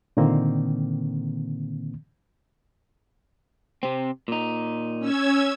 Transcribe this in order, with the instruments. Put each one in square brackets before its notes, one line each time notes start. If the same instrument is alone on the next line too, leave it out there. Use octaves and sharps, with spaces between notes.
[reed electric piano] A#2 D3 D#3 A#3 C4
[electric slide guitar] C3 C4
A#2 D#4
[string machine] C#4 E6 G#6